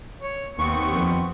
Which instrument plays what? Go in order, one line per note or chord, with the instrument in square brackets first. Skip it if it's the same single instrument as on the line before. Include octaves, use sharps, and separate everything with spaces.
[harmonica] C#5
[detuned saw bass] D#2 [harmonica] B3 C4 [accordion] C#6
[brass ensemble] F2